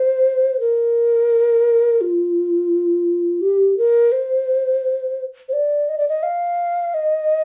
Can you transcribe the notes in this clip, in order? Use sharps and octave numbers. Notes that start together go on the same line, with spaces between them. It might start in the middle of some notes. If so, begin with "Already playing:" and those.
Already playing: C5
A#4
F4
G4
A#4
C5
C5
D5
D#5
D5
D#5
F5
D#5